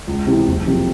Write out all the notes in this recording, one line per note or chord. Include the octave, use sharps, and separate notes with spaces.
C#2
C3 E3
F#1
F2 C3